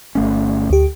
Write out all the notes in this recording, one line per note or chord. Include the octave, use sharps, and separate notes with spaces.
G1 A3 C#4
D2 G4